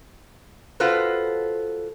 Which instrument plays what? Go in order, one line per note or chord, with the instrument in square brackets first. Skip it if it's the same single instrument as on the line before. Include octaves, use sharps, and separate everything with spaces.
[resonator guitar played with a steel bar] F4 F#4 A4 B4 C5